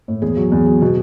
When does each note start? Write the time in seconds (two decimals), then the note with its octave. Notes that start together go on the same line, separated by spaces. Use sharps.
0.08 A2
0.22 E2 G#4
0.37 F#3
0.52 E2
0.66 F#3
0.82 B2